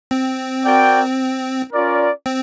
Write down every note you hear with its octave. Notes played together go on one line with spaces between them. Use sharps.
C4
F#4 A#4 D5 G5
C#4 F4 A#4 D5
C4